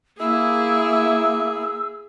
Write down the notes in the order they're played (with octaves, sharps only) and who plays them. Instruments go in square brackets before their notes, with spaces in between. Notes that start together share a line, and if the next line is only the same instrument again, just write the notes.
[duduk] A#3 [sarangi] E4 [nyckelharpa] G#4 [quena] E6